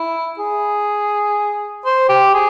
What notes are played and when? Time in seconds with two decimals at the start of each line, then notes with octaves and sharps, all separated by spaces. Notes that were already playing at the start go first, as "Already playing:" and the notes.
Already playing: E4
0.39 G#4
1.85 C5
2.09 G4
2.34 G#4